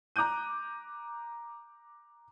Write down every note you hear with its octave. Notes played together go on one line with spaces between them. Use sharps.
A#5 D6 F#6 G6 D#7